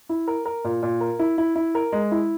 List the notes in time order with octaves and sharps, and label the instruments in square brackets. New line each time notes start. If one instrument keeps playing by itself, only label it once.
[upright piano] E4
A#4
A#4
A#2
A#2
A#4
E4
E4
E4
A#4
G#3
E4